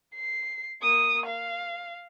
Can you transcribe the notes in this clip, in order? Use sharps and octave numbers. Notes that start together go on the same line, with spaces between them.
C7
A#3 D#6
F5